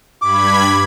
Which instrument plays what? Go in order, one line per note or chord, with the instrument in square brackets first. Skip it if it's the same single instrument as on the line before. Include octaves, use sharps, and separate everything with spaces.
[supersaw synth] G2 B5 G#6 [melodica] D6